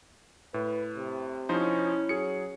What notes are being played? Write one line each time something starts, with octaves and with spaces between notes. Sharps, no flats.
A2 B4
C3
F3 C#4 D#4 E4 C5
F#3 G#4 C#7